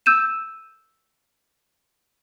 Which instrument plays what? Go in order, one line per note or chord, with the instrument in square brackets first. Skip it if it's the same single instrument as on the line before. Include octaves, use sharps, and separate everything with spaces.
[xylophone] E6 G6 D#7 E7